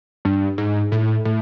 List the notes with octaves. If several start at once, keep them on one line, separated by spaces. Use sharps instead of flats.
G2
G#2
A2
A2